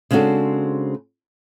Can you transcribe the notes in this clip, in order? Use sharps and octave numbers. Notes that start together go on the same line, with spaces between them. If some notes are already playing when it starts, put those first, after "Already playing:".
C#3 G#3 C4 D4 F#4 A4